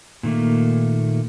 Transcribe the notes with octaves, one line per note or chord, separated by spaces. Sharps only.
A#2 D#3 A3 A#3